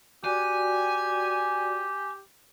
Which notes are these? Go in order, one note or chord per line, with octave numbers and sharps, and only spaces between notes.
F#4 G4 D5 G5 G#5